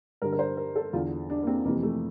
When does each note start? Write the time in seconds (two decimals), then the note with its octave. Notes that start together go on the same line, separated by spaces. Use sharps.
0.22 G2 D3 A#4
0.32 A#4
0.39 C5
0.57 A#4
0.76 A4
0.93 E2 D3 F4
1.30 D4
1.43 A#3
1.47 C4
1.65 F2 C3 E3 A#3
1.83 A3